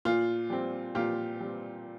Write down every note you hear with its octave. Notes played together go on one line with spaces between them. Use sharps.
A#2 F4
G3 C4
A#2 F4 G4
G3 C4